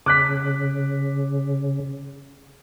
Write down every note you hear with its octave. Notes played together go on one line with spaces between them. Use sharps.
C#3 D6 F#6 B6